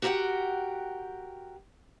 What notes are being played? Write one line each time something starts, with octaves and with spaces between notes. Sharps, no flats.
F#4 G4 A#4 C5 F#5 G5